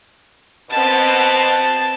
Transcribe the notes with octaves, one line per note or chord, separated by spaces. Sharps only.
B2 C4 A5